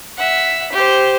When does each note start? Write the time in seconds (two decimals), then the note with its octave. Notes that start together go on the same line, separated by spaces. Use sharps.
0.17 E5 F#5
0.73 G4 C5